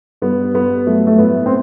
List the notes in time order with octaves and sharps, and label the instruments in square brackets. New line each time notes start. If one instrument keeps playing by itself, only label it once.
[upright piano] G2 B3
G2 B3
F#3 A3
A3
A2 B3
C4